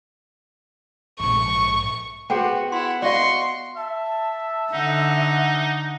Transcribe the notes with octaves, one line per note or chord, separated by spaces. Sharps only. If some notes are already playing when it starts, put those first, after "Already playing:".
A#1 G#2 C#6
B3 F#4 G#4 C5 F#5 G5
E4 F#5 C6
F#4 D5 D#5 F5 C6 C#6
E5 A5
D3 D#4 F#5